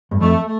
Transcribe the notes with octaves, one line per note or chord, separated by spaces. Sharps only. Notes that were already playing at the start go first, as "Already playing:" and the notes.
G2
F2 A3
A3